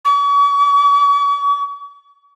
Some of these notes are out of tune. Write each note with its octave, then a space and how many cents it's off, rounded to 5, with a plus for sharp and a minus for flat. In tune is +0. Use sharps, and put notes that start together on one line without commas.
C#6 +45